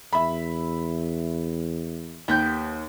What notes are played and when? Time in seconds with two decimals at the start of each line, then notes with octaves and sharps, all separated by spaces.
0.13 E2 E5 B5
2.28 D#2 B3 G4 G6